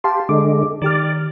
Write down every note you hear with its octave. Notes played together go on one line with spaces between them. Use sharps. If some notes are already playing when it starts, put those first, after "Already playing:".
G4 F5 A5 C6
D3 G#3 D6
D#3 G4 D5 F6